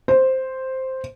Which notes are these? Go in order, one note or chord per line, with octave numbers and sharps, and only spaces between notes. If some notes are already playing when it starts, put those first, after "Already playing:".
C5